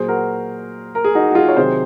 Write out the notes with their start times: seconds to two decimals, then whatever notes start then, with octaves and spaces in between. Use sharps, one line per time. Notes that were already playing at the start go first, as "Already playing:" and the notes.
Already playing: A#2 F#3 G#4 C5
0.08 F#4 A#4
0.95 A#4
1.04 G#4
1.15 D#4 F#4
1.30 F#4
1.35 F4 G#4
1.48 C#5
1.57 C3 D#3 F#3 G#4 C5